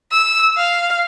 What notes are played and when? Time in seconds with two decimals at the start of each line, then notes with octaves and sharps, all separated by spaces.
0.11 E6
0.57 F5